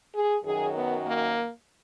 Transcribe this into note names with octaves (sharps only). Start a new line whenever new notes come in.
G#4
F#2 D#3 F#3 G#4
B3
A#3